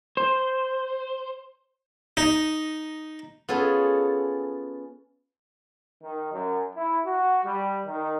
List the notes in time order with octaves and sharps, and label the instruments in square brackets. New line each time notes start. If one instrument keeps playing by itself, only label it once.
[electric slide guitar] C5
[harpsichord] D#4
[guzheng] B3 C#4 F4 G#4 A4
[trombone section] D#3
F#2
E4
F#4
G3
D#3